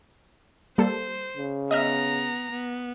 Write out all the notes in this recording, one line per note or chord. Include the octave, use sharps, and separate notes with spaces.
G3 A#3 A4 C5
C#3
B3 D#5 E5 A#5 F6
B3